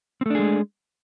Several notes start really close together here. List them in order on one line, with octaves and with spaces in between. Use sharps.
C4 A3 D4 G#4 G#3